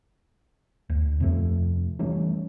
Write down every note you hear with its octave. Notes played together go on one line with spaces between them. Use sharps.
D2
F2 C3 F3 A3
E3 G3 A3 C#4